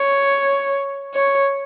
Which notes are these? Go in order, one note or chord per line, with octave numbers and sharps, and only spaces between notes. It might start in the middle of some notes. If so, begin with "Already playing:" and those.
Already playing: C#5
C#5